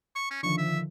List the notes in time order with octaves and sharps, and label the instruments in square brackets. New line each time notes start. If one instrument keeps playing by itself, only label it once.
[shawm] C#6
C#4
[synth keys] D3 D#3 F3 [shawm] C#6
[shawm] E5